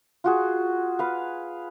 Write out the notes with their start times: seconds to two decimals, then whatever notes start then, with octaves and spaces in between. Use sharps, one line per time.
0.24 F4 F#4 G#4
0.99 B4 F5